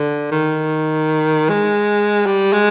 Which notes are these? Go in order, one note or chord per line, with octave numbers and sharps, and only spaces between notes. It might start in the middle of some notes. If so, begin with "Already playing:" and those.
Already playing: D3
D#3
G#3
G3
G#3